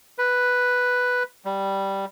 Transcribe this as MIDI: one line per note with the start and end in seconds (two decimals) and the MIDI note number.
0.18 1.23 71
1.45 2.05 55